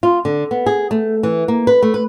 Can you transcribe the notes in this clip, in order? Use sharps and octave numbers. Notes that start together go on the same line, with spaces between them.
F4
D3
B3
G#4
A3
E3
A#3
B4
A3
B4